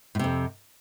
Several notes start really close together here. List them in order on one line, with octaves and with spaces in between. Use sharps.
A2 C3 F2